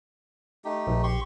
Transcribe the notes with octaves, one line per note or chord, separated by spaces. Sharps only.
A3 D#4 G4
A#1
G4 C6 C#6